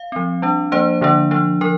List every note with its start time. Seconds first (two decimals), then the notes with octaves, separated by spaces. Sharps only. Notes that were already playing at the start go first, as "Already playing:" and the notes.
Already playing: F5
0.12 F3 C4
0.42 G3 D4
0.72 F3 A#3 D4 C5
1.01 D3 F3 A#3 D4
1.31 F3 D4
1.61 F3 A#4